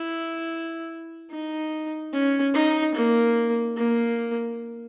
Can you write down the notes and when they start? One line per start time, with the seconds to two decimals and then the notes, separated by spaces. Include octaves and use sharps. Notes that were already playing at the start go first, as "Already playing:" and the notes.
Already playing: E4
1.31 D#4
2.13 C#4
2.54 D#4
2.94 A#3
3.77 A#3